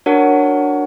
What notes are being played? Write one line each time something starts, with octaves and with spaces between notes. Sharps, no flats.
D4 F#4 A#4 C#5 F#5